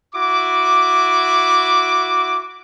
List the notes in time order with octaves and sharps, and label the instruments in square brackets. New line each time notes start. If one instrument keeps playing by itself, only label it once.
[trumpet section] E4 F#4 D6